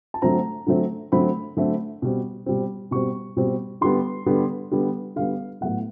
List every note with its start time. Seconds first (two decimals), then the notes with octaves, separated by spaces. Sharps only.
0.14 A5
0.22 D3 F#3 A3 C4 A#5
0.66 D3 F#3 A3 C4
1.12 D3 F#3 A3 C4 B5
1.57 D3 F#3 A3 C4
2.02 B2 G3 C4
2.46 B2 G3 C4
2.91 B2 G3 C4 C#6
3.37 B2 G3 C4
3.81 D3 G3 B3 C6
4.26 D3 G3 B3
4.71 D3 G3 B3
5.16 D3 G3 B3 F5
5.61 A2 F#3 B3 F#5